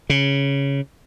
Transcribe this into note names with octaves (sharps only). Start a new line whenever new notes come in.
C#3